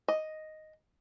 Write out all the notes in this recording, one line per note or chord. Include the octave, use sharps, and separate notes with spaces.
D#5